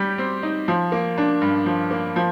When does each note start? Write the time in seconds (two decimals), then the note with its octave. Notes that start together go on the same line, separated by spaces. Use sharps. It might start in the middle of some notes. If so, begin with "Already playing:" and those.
Already playing: G3 G4
0.18 C4
0.43 D#4
0.68 F3
0.92 A#3
1.18 D4
1.41 G2
1.66 F3
1.91 A#3
2.16 F3